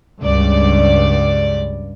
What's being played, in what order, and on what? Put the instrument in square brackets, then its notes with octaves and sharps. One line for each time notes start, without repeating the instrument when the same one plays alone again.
[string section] C#2 G2 D5